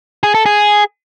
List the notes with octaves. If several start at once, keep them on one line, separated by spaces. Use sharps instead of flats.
G#4
A4
G#4